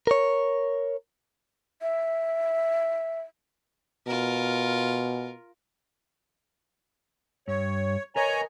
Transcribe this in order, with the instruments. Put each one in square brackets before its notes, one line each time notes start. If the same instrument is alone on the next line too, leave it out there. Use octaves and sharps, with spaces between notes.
[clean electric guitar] A#4 C#5
[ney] E5
[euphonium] B2 [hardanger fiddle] F4 A#4
[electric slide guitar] G2 [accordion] C#5
[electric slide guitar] A#4 B4 D#5 [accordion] C#5 G#5 A#5